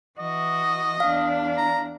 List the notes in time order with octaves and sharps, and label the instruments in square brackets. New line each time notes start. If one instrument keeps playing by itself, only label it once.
[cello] E3 F#4 [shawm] D#5
[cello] E2 D4 [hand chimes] F5
[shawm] A#5